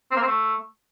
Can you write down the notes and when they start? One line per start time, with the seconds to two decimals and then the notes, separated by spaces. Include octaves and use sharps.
0.11 C4
0.16 A#3
0.22 C4
0.27 A3